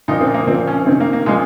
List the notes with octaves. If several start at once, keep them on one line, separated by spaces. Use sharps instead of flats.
A#2 F3 D#4
C4
A#3
A#2 F3 C4
C#4
C3 D#3 C4
A#3
A#3
A#2 F3 G#3